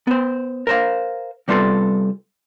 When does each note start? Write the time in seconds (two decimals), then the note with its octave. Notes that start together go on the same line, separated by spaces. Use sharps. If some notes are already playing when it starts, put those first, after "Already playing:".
0.07 B3 C5
0.67 A#4 C5 F5
1.48 C3 G3 B3 F4 A4